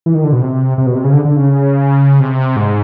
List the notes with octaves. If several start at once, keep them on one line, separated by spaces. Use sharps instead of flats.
E3
D#3
D3
B2
C3
C3
B2
C3
C#3
D3
D3
C#3
C3
G#2